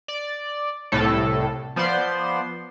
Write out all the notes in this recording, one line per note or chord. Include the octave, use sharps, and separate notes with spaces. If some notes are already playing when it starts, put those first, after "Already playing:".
D5
C2 A2 A4
F3 B3 C5 D5 C6